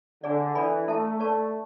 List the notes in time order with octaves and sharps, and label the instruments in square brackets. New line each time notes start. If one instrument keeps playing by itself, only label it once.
[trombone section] D3 [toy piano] D4 G#4 D5
[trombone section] E3 [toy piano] D4 A4 D5 G#5 B5
[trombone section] A3 [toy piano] E4 A4 E5 A5
[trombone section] A3 [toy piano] B4 D5 A5 C#6